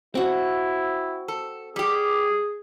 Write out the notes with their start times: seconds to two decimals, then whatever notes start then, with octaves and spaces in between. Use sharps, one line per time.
0.15 C4 E4 F#4
1.28 A4
1.76 G3 G4 G#4